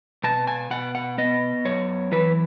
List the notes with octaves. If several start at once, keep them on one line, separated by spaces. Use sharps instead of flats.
B2 A5
G#5
B2 F#5
F#5
B3 D#5
F#2 C#5
E3 B4